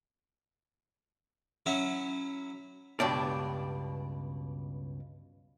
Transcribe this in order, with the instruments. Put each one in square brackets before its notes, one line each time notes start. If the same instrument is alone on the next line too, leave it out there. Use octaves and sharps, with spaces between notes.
[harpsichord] F#3 C#4 E4
[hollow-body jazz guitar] C#2 G2 B2 D4 G4 D5